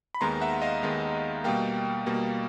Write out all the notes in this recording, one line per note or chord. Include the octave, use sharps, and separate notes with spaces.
B5
D#2 D#3 G#3 B3 A#5 C6
E5 F#5
F#5
D#5 F5
D#2 D#3 G#3 B3
B2 G3 A#3 F5 G5
B2 G3 A#3